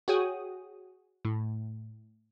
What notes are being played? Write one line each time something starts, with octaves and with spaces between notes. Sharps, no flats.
F#4 G#4 C#5 G5 D#6
A2